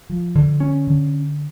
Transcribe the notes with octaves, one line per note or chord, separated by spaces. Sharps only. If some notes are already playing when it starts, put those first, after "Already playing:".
F3
D3
C#4
D3